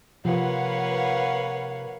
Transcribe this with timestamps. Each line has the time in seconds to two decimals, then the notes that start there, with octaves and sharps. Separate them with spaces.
0.25 C3 F3 A#3 F4 B4 C#5 F5 F#5